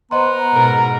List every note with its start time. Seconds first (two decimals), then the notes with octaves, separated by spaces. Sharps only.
0.11 B3 C5 D#5 A#5 C6
0.52 G#2 B2 A#4